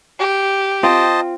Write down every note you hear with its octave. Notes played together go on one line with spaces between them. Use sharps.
G4
C4 F4 C5 D#5 A5